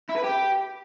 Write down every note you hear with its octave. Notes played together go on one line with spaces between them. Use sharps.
E4
B4
G4